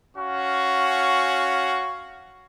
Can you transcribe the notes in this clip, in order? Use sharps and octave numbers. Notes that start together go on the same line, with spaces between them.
C#4 F#4 F5 C#6